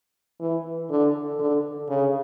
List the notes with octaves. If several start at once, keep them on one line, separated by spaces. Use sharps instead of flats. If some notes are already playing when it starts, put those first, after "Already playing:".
E3
D3
D3
C#3